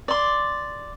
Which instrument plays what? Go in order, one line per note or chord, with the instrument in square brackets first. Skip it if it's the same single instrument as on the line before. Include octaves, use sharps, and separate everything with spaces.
[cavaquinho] D5 C6